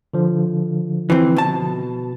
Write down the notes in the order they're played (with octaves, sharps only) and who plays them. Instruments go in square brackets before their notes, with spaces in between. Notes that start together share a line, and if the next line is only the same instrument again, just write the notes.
[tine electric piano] D3 F3
[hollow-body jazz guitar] E3 C4
B2 A5